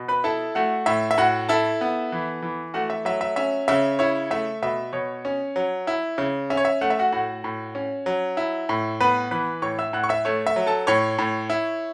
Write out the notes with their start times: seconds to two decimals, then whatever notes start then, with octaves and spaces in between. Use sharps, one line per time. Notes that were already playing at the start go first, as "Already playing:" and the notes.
Already playing: B2
0.08 B4 B5
0.24 E4 A4 A5
0.55 A3 F#4 F#5
0.86 A2 E5
1.11 E5
1.18 A2 F#4 F#5
1.49 E4 A4 A5
1.81 B3
2.12 E3
2.42 E3
2.74 A3 F#4 F#5
2.90 E5
3.05 F#3 E5
3.21 E5
3.36 C#4 E5
3.68 C#3 E5
3.99 E4 C#5
4.30 A3 E5
4.62 B2 E5
4.93 B2 C#5
5.25 C#4
5.56 F#3
5.87 E4
6.18 C#3
6.50 C#4 E5
6.57 C#5
6.65 E5
6.81 A3 F#5
6.90 E5
6.99 F#4 F#5
7.12 A2 F#4 F#5
7.44 A2
7.75 C#4
8.06 F#3
8.37 E4
8.69 A2
9.00 B3 B4 B5
9.31 E3 B4 B5
9.62 A2 C#5 C#6
9.79 E5 E6
9.93 A2 F#5 F#6
10.04 C#6
10.09 E5 E6
10.25 A3 C#5
10.46 E5
10.56 F#3
10.67 A4 A5
10.87 A2 C#5 C#6
11.19 A2
11.50 E4